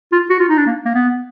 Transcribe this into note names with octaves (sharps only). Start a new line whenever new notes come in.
F4
F#4
F4
D#4
D4
A#3
A#3
B3